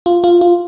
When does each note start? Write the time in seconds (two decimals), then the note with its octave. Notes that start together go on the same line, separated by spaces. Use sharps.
0.06 F4
0.24 F4
0.41 F4